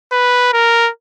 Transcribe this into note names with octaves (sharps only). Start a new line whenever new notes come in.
B4
A#4